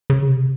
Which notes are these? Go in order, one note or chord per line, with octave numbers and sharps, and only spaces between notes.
C#3
C3